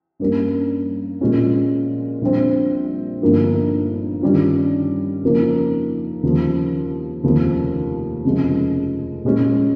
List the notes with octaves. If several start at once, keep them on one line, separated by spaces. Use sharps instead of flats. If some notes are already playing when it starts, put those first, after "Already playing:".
G2 G3 A#3 C#4
A#2 G#3 C#4 F4
A#1 A#2 G3 C4
G1 G2 F3 A#3 D#4
G2 D#3 G3 C#4 F4
F2 C#3 F3 A#3 D#4
D#2 C#3 F3
F1 D#2 C#3 F3
F1 F2 C#3 F3 G#3
A#2 G#3 C#4